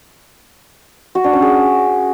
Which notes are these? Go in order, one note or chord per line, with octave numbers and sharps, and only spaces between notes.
F#4
D4
C#4
G#4